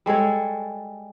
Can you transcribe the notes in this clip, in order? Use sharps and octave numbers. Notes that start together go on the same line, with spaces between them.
G3 G#3 A4 C#5